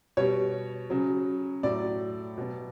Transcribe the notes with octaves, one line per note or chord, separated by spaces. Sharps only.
B2 G3 C#5
C#3 F#3
A2 F#3 D5
B2 F#3